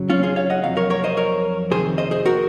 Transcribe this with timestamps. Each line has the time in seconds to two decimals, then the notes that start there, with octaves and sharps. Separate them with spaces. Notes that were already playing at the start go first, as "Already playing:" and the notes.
Already playing: F#2 C#3 F#3
0.10 C#4 F4
0.23 F4 G#4
0.36 C#5 F5
0.50 D#5 F#5
0.63 F2 C3 F#3 F5
0.77 A#4 C#5
0.90 A#4 C#5
1.04 C5 D#5
1.17 A#4 C#5
1.71 F2 C3 D#3 G#4 C5
1.98 C5 D#5
2.11 G#4 C5
2.26 F#4 A#4